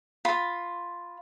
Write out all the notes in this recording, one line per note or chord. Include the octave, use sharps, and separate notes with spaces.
F4 B5